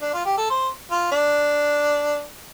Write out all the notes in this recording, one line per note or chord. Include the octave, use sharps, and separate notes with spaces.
D4
F4
G4
A4
C5
F4
D4